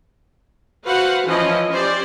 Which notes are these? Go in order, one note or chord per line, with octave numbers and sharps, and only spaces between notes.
F#4 B4 C5 F5 F#5
E3 F3 C#4 E4 D#5
C#4 G4 C5 D5